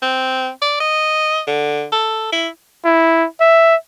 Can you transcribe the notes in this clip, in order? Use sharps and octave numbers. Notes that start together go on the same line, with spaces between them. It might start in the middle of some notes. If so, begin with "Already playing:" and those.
C4
D5
D#5
D3
A4
E4
E4
E5